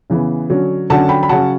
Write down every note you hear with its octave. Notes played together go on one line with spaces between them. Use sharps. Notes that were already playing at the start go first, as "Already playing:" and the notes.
C#3 E3 B3
D3 F#3 C#4
D3 F#3 C#4 F#5 A5
G5 B5
B5
C#3 F#3 C#4 F#5 A5